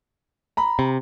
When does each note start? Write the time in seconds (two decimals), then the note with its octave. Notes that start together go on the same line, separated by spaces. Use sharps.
0.57 A#5 B5
0.79 C3